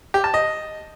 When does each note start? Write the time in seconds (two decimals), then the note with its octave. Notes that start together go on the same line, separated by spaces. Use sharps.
0.14 G4
0.24 A5
0.34 D#5